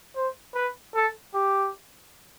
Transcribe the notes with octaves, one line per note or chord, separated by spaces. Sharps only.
C5
B4
A4
G4